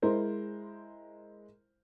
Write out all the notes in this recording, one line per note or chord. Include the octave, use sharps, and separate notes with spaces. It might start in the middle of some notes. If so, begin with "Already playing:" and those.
G#3 E4 A#4 C5